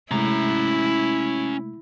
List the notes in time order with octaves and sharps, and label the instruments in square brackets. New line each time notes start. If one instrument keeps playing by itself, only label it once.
[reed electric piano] C3 G#3 A3 [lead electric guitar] C#4 A#5 [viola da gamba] E4